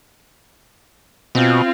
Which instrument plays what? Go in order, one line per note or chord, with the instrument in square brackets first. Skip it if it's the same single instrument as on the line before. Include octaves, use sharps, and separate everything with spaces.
[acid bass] B2 [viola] C4 F4